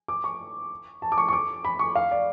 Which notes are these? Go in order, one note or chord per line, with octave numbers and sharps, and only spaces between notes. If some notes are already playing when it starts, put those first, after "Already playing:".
D6
C#6
A5
D6
C#6
C#6
D6
B5
C#6
F5
D5